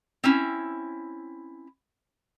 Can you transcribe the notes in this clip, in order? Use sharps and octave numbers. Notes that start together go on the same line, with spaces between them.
C4 C#4 E4